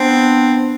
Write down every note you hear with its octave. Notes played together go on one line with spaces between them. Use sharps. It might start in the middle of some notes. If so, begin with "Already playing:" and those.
Already playing: B3 C4 D4